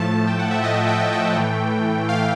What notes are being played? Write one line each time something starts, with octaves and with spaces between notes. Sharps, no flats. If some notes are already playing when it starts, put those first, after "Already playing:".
Already playing: A2 F3 A3 A5
G5
F#5
E5
D#5
D#5
G5
G5
G5
G5
A2 E3 A3
F5